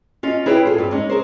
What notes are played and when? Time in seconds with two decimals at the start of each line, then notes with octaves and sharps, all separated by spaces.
0.23 C#4 F4 D#5
0.46 E4 G#4 B4 C#5 F5 G5
0.65 F4 G#4 A4
0.78 G2 C4
0.91 G#3 C#4 D#4
1.10 G#4 A#4 C5